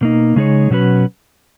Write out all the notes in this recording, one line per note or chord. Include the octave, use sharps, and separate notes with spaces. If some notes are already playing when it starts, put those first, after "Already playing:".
B2 A#3 D#4
C#3 G#3 D#4 G#4 C#5
B2 F#3 C#4 F#4 B4